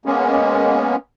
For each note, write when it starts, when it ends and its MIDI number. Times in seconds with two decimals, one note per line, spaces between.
0.05 0.96 56
0.05 0.96 58
0.05 0.96 59
0.05 0.96 61